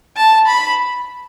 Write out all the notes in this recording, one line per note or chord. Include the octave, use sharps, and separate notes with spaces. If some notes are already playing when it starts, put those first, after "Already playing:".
A5
B5